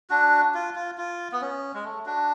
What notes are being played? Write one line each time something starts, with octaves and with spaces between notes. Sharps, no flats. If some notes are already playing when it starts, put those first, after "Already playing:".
D4 F#4
F4
F4
F4
B3
C#4
G#3
A3
D4 F#4